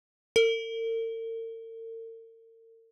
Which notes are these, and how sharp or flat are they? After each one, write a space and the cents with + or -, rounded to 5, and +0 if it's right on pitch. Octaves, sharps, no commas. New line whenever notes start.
A#4 -45